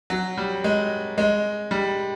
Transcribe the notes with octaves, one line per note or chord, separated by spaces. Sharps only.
F#3
G3
G#3
G#3
G3